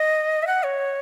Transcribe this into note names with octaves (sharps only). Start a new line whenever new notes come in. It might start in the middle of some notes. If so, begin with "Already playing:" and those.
Already playing: D#5
E5
F#5
C#5